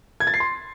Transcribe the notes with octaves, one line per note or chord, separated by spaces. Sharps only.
G#6
A6
C7
C6